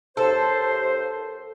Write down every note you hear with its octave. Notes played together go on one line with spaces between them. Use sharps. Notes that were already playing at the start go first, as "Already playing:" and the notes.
D#2 A4 C5